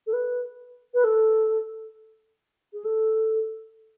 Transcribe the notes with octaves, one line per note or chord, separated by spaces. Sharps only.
A4
B4
B4
A4
G#4
A4